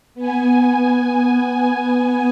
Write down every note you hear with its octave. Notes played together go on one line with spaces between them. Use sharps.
B3 G#5